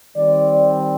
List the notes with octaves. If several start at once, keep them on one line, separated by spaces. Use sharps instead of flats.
D#3 G3 C4 D5